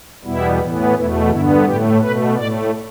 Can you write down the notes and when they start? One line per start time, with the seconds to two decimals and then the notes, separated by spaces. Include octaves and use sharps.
0.24 E2 B2 G3 B3 E4
0.59 A2 E3 B3
0.95 E2 B2 A3 E4
1.30 G2 D3 B3 E4
1.66 A2 A3 G4
2.01 B2 A3 B4
2.36 A2 A3 D5